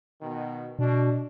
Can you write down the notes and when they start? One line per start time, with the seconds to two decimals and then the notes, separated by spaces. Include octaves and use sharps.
0.22 B2 D#3
0.79 B2 D4